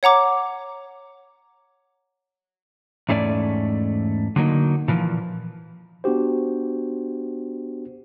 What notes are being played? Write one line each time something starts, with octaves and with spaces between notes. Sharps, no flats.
C#5 F#5 A#5 D6
E2 G#2 A3 C#4 D5
D3 F#3 A#3 D#4
A#2 E3 F3
B3 D4 F#4 G4 C5